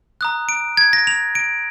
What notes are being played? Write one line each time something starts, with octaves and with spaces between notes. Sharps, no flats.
A#5 D#6 F#6
D7
G#6
A#6
F7
D7